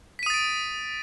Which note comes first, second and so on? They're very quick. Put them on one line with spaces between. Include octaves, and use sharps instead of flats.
B6 D#7 D#6 A6 D7